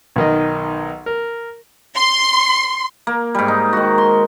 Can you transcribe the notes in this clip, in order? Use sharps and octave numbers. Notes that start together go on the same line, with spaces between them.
B1 D#3 D#5
A#4
C6
A#3
G#2 G3
D#4
D#3 F#4
C6